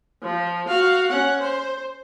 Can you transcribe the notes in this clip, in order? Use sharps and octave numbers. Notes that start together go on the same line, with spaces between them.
F3
F#4 F5
C#4 F#5
C5